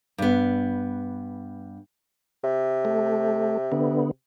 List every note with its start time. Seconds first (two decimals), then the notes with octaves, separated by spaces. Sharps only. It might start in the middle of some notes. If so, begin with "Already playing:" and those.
0.18 G2 B3
2.44 C3
2.85 A3
3.72 D3 B3